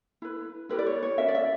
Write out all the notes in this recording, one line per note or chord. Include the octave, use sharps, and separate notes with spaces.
E4 B4
E4 G4 A#4 B4
D5
C#5
C#5
C#4 F#4 A#4 E5
D5
E5